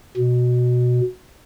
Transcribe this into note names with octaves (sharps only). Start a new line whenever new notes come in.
B2